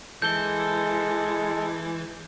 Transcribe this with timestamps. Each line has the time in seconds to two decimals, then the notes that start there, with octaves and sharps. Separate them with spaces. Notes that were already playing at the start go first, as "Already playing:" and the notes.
0.22 E3 G#3 A4 G6 G7